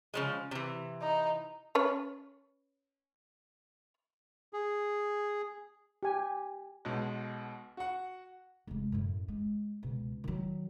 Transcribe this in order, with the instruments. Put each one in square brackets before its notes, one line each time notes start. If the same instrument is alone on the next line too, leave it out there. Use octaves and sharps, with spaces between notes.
[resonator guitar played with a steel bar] C#3 F3 G#3
C3 E3
[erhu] D#4
[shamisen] C#4 B4 C#5
[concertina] G#4
[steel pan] G4 G#5
[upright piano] B1 B2 G#3
F#4 F#5
[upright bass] F1 G#3
F#2 A2
G#3
C#2 B2
D#3 F#3